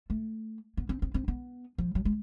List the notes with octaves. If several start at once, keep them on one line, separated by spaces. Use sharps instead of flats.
A3
B3
C4
C4
C4
B3
F3
F#3
G#3